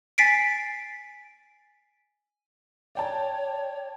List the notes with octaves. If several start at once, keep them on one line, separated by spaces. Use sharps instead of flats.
G#5 A6 B6 C7 D7
C#5 D5 G5 A5